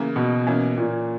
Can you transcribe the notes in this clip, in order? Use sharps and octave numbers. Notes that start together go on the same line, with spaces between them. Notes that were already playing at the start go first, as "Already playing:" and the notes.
Already playing: C#3 E3 A#3
B2
E3 A#3 C#4
A#2